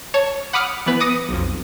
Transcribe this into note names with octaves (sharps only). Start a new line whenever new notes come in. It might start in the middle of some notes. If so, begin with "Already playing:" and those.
C#5 A5
F#5 B5 D6 D#6 F6 C#7
E3 B3 B4
D6 D#6 A#6 C#7 D#7
B1 F2